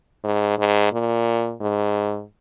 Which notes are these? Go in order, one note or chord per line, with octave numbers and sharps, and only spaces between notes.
G#2
G#2
A#2
G#2